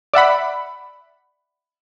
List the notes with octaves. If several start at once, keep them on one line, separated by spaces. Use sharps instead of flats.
D5 E5 F#5 B5